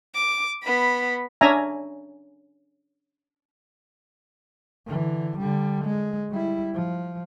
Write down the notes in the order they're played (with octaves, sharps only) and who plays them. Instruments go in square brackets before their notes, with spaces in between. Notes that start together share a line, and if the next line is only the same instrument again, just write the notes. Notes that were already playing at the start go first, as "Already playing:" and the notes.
[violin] D6
B3 B5
[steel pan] C#4 D4 E5 G#5 A#5
[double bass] D3 E3
D3 G3
G#3
G3 E4
F3